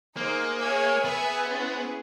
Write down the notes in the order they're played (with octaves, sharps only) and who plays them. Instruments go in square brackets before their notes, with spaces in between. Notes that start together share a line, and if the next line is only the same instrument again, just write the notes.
[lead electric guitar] A#3 [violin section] D#4 G#4 C5
[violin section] G#4 C#5 E5 G#5
[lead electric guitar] B3 [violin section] G#4 B4 E5 G#5
[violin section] C#4 E4 G#4 C5